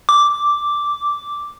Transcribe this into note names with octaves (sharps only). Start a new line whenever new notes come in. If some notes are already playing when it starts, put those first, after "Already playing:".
D6